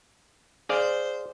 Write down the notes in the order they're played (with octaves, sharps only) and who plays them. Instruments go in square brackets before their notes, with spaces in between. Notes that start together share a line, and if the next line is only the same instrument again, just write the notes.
[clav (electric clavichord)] G#4 D5 F5 [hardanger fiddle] C5